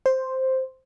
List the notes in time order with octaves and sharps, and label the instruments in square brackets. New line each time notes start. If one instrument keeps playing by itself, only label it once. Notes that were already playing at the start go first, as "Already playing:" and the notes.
[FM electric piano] C5